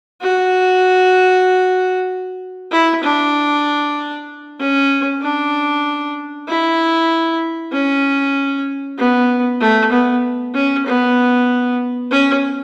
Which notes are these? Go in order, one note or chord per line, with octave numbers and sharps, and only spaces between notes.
F#4
E4
D4
C#4
D4
E4
C#4
B3
A3
B3
C#4
B3
C#4